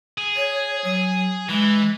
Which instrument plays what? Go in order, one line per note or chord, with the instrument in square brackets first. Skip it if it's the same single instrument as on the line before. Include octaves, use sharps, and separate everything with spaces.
[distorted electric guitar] G#4
[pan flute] C#5
F#3
[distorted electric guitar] E3 [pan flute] G#3